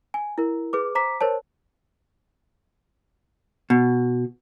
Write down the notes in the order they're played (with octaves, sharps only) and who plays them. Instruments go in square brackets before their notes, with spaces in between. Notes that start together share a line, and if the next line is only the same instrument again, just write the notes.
[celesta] G#5
E4 A#4
G#4 B4 D6
C5 A#5 D6 B6
A#4 C5 C#5 A5
[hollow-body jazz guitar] B2